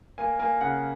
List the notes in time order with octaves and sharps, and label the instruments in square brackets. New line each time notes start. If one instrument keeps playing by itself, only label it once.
[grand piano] A#3 G#5
A#3 G#5
C#3 F#5